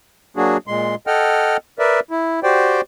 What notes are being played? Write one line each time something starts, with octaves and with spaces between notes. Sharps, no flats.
F#3 A#3 D4 F#4 G#4
A#2 G#3 C6
A4 D#5 F#5 G5 F6
A#4 B4 D5 E5
E4
F#4 G4 C5 D5 G5